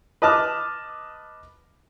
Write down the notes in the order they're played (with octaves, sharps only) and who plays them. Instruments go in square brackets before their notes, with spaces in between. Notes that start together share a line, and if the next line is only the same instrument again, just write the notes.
[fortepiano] B4 D#5 A5 D6 F6